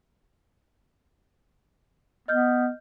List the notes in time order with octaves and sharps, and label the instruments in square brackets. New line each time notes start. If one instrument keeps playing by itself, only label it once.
[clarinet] B3 [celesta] D#5 F6 G6